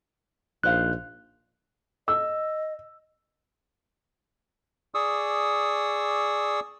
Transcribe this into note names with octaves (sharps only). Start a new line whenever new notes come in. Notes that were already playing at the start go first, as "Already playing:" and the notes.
A#1 D#4 C5 F5 F#6
D#5 E6
G#4 D5 C#6 D#6 E6